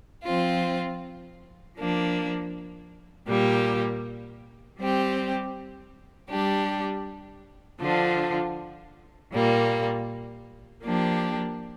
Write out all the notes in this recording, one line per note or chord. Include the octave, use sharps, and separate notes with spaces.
F3 C4 F4
F3 A#3 D4
A#2 G3 A#3 G4
G3 C4 G4
G3 D4 G4
D3 F3 D4 F4
A#2 G3 A#3
F3 A#3 D4 G4